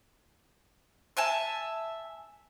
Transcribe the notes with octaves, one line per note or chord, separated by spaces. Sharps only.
E5 G#5 A5